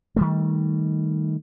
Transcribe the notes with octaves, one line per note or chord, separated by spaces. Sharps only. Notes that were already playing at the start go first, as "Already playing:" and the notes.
D#3 G3 A3